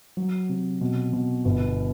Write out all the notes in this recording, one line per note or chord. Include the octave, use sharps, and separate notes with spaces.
F#3
C3
B2
B2
G1